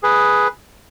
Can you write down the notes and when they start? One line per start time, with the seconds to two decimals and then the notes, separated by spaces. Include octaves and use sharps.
0.03 G#4 B4